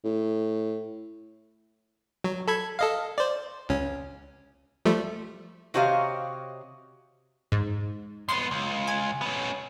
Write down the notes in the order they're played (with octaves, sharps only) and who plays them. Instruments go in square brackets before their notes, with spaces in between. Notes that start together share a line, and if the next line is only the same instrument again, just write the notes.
[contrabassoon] A2
[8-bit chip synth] F#3
A4 B5 G#6
A4 D#5 F5
C5 D5
C#2 C#4
F3 G3 A3
[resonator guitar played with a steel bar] C3 F#4 G4 C#5 D#5 F5
[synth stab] G#2
[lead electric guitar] F#2 B3 [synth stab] C6
[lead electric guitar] C#2
[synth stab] G#5
[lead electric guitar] B3 C#4